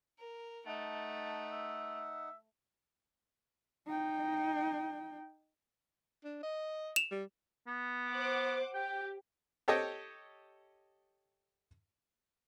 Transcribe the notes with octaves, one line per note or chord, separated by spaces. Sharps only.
A#4
A3 D#4 F#5 A5
E5
D#4 G5
D4
D#5
E7 F7
G3
B3
C5 F#5 D6
G4 G5
G4 A4 C#5 D#5 G5